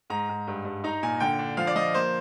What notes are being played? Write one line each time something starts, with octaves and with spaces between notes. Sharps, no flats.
G#2 A#5
G#2
G2
G2
D#4 A#5
A#2 G#5
D3 G5
D4
F3 F5
D5
F3 D#5
A#3 C5